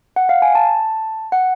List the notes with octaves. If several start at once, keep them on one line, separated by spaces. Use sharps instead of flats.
F#5
F5
G#5
A5
F#5